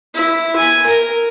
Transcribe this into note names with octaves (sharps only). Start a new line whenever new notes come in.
E4
G#5
A#4